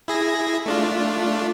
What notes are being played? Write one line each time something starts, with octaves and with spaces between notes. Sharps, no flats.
E4 G#4 A#6
A3 D4 F4